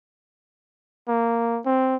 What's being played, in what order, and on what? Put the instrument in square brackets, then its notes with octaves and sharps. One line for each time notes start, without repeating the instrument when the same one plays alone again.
[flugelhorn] A#3
C4